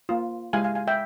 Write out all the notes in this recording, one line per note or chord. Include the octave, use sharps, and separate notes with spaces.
A#3 F4
G#3 E4 G4 F5 G#5
F5 G#5
F5 G#5
E5 G5